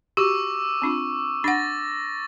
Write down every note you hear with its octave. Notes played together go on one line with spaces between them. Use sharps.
F#4 G4 C#6 D6 E6
C4 D4 F4
D4 F#5 A6 A#6